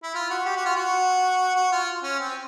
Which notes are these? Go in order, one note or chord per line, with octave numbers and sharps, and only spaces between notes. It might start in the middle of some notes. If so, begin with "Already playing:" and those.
E4
F4
F#4
G4
F#4
F4
F#4
F#4
F4
C#4
C4